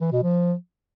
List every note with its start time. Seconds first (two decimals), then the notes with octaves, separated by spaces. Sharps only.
0.01 E3
0.12 B2
0.23 F3